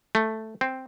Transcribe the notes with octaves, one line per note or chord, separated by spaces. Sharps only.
A3
C4